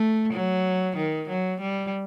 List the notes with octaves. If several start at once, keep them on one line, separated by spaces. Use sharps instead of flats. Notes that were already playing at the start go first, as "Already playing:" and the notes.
Already playing: A3
F#3
D#3
F#3
G3